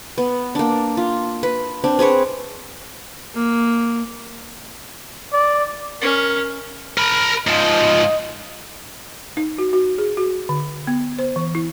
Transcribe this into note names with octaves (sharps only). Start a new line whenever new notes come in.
B3
A#3 D4
F4
B4
C4 D4
C4 G#4 B4 C#5
A#3
D5
C#4 A#4
A#4 B5
G#2 F3 D#5
D#4
F#4
F#4
G#4
F#4
D3
B3
C5
E3
E4